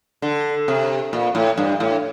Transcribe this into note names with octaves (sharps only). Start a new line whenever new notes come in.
D3
C3
A#2
A2
G2
A2